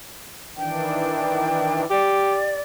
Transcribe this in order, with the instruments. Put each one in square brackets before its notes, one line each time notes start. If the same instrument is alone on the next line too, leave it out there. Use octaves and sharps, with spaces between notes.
[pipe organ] D#3 E3 D4 [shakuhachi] G5
[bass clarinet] G4 [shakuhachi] D5